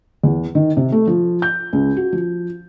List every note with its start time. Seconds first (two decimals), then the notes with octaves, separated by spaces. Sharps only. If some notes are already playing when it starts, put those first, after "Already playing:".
0.23 E2
0.55 D#3
0.77 C3
0.92 A3
1.07 F3
1.42 G6
1.73 C#2
1.97 F#4
2.12 F3